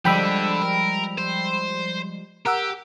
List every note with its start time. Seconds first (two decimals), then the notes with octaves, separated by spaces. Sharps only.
0.05 D3 F3 G3 G#3 G5 B5 E6
0.62 A#4
1.18 C5
2.46 G4 A#4 F#5 E6